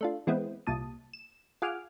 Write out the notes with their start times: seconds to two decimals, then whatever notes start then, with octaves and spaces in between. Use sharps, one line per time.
0.01 A3 D4 F4
0.27 E3 G#3 B3 C4 E4
0.67 C2 A#2 A5 D#6
1.13 E7
1.62 F4 G#4 F#5 G#5 D6 F6